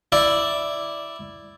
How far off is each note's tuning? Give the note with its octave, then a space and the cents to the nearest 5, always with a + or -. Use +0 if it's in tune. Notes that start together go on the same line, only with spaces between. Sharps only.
E4 +0 D5 +0